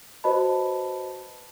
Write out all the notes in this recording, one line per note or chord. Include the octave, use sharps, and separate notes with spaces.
F#4 B4 C5 D#5 A5 B5